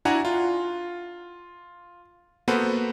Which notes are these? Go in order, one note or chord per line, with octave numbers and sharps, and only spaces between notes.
D4 E4 F#4 F#5 G#5 A#5
F4
A#3 B3 F#4 A4 B4 C5